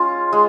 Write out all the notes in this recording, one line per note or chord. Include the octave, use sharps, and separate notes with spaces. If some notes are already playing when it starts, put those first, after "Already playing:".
Already playing: G#3 C#4 F4
G#3